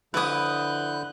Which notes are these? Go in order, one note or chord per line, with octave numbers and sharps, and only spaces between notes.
F2 D3 E4 B4 D#6 F#6 G6